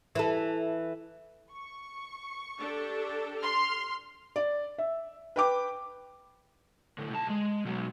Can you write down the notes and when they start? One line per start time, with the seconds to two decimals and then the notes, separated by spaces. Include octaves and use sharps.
0.15 E3 A4
1.51 C#6
2.59 D4 G4 A4
3.39 C6 F6
4.36 D5
4.78 E5
5.36 B4 G5 D6
6.98 A2 D3
7.11 B1 A5
7.29 G#3
7.65 B2 F#3